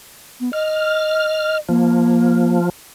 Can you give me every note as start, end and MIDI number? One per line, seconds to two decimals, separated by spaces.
0.40 0.51 59
0.53 1.59 75
0.53 1.58 89
1.69 2.69 53
1.69 2.58 58